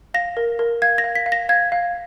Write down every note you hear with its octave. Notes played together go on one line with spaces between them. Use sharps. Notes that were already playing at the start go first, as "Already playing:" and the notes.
F5 A#6
A#4
A#4
F5 G#6
A#6
F5
B6
F5
A#6
F5 G#6
F5